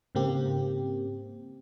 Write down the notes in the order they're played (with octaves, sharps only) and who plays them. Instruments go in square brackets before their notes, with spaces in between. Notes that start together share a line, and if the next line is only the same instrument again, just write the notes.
[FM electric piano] G#2 C#3 A#3 C4 G4